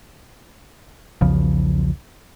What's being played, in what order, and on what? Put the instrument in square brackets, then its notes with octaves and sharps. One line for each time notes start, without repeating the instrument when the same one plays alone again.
[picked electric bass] B1 E2 C#3 F3